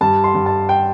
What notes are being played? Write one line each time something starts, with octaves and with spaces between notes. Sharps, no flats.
G2 A5
C6
G2
A5
G5